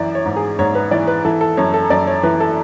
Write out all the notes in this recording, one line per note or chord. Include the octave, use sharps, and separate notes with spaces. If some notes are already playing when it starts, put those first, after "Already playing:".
Already playing: F#2 E3 D5
C#5
G#2
G#4
G#2 C#5
B4
E3 D5
B4
E3 A4
A4
F#2 C#5
A4
F#2 D5
C#5
E3 B4
A4